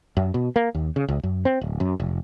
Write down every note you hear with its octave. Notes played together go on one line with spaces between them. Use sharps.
F#2
B2
A#3
D#2
C#3
C#2
F#2
C4
D1
F#2
F1